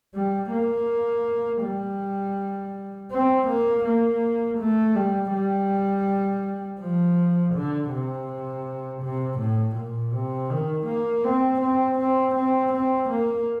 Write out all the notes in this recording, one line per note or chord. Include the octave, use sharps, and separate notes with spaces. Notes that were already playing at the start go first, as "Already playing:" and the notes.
G3
A#3
G3
C4
A#3
A#3
A3
G3
G3
F3
D3
C3
C3
A2
A#2
C3
D#3
A#3
C4
C4
C4
C4
C4
A#3